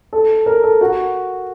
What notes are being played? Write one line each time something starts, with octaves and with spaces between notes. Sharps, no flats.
A4
A#4
A4
F#4